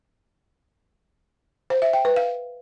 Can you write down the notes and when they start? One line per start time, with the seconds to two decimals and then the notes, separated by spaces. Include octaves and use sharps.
1.70 C5
1.82 E5
1.93 G5
2.05 B4
2.16 F5